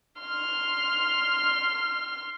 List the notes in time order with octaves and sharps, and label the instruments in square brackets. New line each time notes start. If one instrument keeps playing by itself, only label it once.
[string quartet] C6 F6